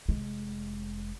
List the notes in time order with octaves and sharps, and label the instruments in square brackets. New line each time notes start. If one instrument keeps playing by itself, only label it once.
[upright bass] F1 G#3